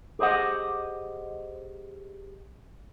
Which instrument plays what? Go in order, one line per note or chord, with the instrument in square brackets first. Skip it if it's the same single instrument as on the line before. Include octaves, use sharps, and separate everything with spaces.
[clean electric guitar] G4 G#4 C5 D#5 F#5